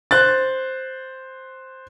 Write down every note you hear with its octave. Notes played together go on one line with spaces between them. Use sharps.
C5 F#6 A6